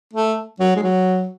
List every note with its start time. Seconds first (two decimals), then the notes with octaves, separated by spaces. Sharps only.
0.13 A3
0.60 F#3
0.76 G#3
0.83 F#3